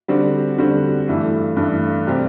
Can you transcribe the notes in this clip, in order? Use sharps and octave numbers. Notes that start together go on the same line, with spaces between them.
D3 G3 C4 F#4
D3 G3 C4 F#4
G2 E3 A3
G2 E3 A3
C3 G3 C4 G4